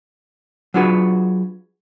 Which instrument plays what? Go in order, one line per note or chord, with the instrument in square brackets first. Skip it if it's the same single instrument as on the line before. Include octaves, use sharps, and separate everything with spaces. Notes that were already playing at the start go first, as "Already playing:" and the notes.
[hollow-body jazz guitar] F#3 D4 F4 F#4 G#4 B4